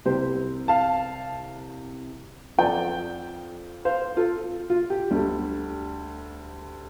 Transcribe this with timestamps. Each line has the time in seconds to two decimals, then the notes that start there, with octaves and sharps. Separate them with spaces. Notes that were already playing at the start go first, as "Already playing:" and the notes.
0.05 C2 C3 G3 G4 C5
0.68 F5 A5
2.58 F2 F3 D5 G5
3.85 C5 F5
4.17 F4 A4
4.70 F4
4.90 G4
5.11 D2 D3 G3